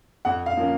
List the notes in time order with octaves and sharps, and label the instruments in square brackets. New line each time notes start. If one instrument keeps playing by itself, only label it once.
[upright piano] F2 F#5
F5
F3 A#3 C#4